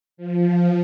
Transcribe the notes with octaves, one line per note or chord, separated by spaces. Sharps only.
F3